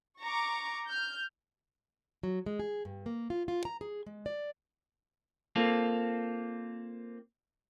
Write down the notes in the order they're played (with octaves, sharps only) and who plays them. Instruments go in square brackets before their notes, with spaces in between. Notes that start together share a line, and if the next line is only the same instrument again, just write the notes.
[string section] A#5 C#6 D6
F6 G6
[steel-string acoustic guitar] F#3
G#3
G#4
G2
A#3
F4
F4
A#5
G#4
G#3
D5
[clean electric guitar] A#3 C4 F4 A4